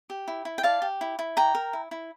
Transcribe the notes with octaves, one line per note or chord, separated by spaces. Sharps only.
G4
E4
E4
G5
D5 F5 A5
G4
E4
E4
D5 G5 A#5
A#4
E4
E4